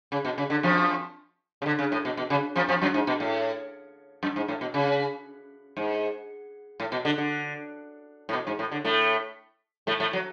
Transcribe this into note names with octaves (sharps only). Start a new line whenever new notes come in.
C#3
B2
C#3
D3
F2 F3
C#3
D3
C#3
A2
B2
B2
C#3
F2 F3
F2 F3
F#2 F#3
G#2
B2
A2
F#2
G#2
A2
B2
C#3
G#2
A2
B2
D3
D3
A2
B2
G#2
A2
D3
A2 A3
A2 A3
A2 A3
F#3